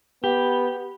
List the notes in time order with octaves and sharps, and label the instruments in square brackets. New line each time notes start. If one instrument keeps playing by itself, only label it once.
[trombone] B3 [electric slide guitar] G4